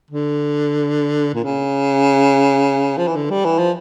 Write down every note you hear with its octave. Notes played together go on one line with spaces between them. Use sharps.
D3
A#2
C#3
F3
E3
D3
G3
E3
F3